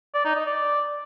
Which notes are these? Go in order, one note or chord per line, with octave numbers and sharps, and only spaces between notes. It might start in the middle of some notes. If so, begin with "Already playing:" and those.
D5
D#4
D#5
D5